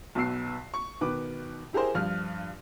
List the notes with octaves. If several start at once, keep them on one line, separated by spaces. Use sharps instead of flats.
B1 B2 B3 E6 C7
C#6
B2 D#3 B4 D6
E4 G4 G#4 A#4 C5
G2 F3 F6